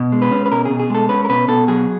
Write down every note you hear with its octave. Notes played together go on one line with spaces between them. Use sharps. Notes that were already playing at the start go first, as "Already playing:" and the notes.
Already playing: B2
G#3
B4
C#4
B4
B2 A#4
B2 G#4
G#4
G#3 A4
C#4 B4
A#4
B2 B4
B2 A4
F#3 G#4